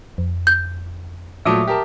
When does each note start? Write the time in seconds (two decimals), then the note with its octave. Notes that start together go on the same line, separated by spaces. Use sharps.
0.18 F2
0.47 G6
1.45 A#2 F#3 A3 E5 D6 D#6
1.67 G4 A#4 A5